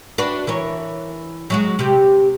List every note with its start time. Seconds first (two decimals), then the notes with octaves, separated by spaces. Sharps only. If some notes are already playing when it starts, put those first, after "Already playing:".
0.18 D4 F#4 B4
0.47 E3 A#4 C#5
1.50 F#3 G#3 F#4
1.79 C3 G4